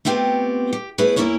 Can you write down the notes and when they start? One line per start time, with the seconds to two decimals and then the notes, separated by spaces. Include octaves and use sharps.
0.05 A3 B3 C4 F4 G4
0.73 G4
0.98 A3 B3 E4 G#4 B4 C#5
1.16 E2 A#2 A#3 C#4 E4 C#5